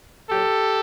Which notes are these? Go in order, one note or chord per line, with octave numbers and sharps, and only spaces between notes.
A#2 F#3 G4 A4